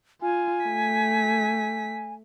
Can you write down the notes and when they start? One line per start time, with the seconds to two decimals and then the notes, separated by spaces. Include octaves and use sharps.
0.22 F4 G#5
0.66 A3 B6